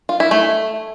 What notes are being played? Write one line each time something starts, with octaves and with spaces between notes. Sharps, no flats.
F4
E4
A3